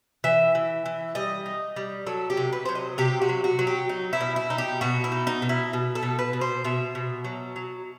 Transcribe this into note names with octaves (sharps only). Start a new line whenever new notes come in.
E3 E5
E3
E3
G3 D#5
D#4
G3
F#3 A4
G4
C3
B4
F#3 C5
D#5
C3 G4
F#4
F#3
F#4
F#3
G4
D#4
E4
B2
E4
D#4
G4
B2 F#4
E4
D#4
D#4
B2
E4
B2
A4
B2
B4
B2
C5
B2 E5
B2
F#3
F#3